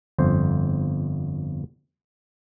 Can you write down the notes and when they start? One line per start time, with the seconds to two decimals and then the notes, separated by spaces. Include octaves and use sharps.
0.18 G1 F2 C5